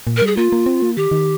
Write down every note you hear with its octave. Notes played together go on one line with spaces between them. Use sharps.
A#2
A#4
G3 G#4
A#3 F4
A#3
C4
A#3
D#3 G4
D#3